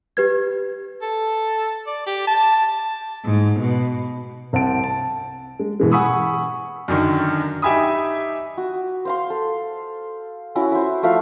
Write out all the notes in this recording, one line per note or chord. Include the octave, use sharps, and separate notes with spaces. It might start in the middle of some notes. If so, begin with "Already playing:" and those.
G4 B4 G#6
A4
D5
G4
A5
A5
G#2
B2
C2 C4 F#5 A5 D7
A5
G#3
B2 E3 G#3
F#5 G#5 B5 C#6 D#6 E6
F#2 D3 D#3
D#4 G4 E5 G#5 B5 D#6
F#4
C5 F5 C6
A4
C#4 E4 F#4
C5 E5
F3 A3 E5 F5